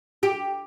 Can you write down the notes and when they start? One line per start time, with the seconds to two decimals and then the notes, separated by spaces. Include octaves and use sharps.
0.23 G4